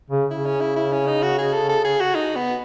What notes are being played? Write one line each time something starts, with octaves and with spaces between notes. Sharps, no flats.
C#3
C#3 E4
C#4
E4
E4
C#4
D#4
F#4
G#4
A4
A4
G#4
F#4
D#4
B3